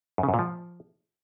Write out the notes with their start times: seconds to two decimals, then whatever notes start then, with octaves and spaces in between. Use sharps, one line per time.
0.18 F#2
0.23 C#3
0.29 F#2
0.34 A#2
0.39 F3